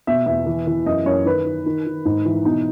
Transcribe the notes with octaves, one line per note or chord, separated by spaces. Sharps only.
B2 E5
E2 E5
E3
E3
F#2 D#5
F#2 C#5
D#3 B4
D#3
D#3
D#3
G#2
E3
B2 D#4